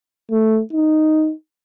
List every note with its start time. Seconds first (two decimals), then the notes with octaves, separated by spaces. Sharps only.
0.31 A3
0.73 D#4